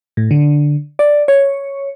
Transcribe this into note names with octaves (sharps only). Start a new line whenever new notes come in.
A2
D3
D5
C#5